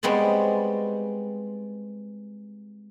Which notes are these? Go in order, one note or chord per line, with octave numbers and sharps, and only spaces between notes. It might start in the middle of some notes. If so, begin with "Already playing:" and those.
G3 G#3 B3 C4 C#5 D5